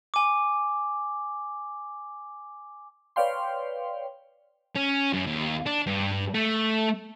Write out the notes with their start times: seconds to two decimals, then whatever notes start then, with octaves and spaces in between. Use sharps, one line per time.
0.14 G#5 D6
3.16 B4 C#5 D5 F5 G5 C6
4.76 C#4
5.13 F#2
5.26 D#2
5.66 D4
5.87 G2
6.34 A3